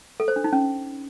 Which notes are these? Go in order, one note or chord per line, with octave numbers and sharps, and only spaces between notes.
A4
C5
D4
D#4
C#4